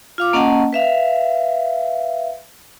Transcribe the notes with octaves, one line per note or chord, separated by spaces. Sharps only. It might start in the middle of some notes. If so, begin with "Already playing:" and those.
F4 F5 D6
A#3 C#4 D#5 F#5 A5
B4 E5 F5